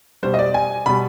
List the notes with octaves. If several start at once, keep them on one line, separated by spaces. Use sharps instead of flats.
B2 G3 C5
D#5
D5
G#5
B2 G3 B5